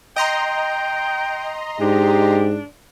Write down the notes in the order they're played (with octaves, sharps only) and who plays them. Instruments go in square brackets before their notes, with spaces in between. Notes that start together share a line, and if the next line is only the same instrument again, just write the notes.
[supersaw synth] D#5 A#5 C6 [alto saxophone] G5
[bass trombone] G#2 [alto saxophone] D4 [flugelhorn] G4